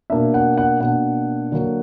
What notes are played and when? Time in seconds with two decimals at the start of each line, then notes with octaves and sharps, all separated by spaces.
0.10 B2 A#3 D4 E5
0.34 F#5
0.58 F#5
0.80 B2 A#3 D4 F#5
1.52 D3 F#3 A#3